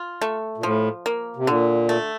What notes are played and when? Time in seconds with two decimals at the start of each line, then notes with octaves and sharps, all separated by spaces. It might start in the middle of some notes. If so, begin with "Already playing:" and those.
Already playing: F4
0.21 A3
0.58 A#2
0.63 A2 F3
1.06 A#3
1.36 C3
1.47 A#2 D3
1.89 A3